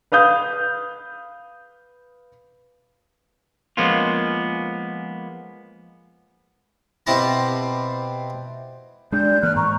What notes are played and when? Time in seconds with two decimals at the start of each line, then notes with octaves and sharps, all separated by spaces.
0.12 B4 F5 D#6 G6
3.77 F3 G#3 A#3 B3 C#4 F4
7.06 B2 C4 E4 G4 A5 A#5
9.12 G#3 D4 D5 G6
9.42 G2 E3 A#3 F6 F#6
9.56 G#2 A#5 C#6